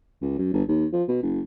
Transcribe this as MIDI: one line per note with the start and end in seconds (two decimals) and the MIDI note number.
0.21 0.35 37
0.38 0.51 42
0.53 0.62 31
0.68 0.86 39
0.92 1.04 53
1.08 1.19 47
1.22 1.41 30